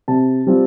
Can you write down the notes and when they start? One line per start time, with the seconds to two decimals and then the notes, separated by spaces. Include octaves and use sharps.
0.08 C3 A5
0.47 G3 C4 F4